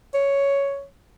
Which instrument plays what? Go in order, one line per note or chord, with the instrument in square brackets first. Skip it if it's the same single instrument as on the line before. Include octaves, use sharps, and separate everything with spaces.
[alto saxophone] C#5